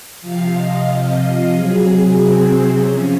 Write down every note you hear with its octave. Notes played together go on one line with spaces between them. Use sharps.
C3 F3 F5
D#5
F5
F5
C3 F#3 G#4
C4
C4
C3 F3 C#4